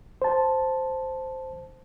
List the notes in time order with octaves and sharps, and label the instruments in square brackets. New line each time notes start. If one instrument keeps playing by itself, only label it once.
[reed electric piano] C5 A5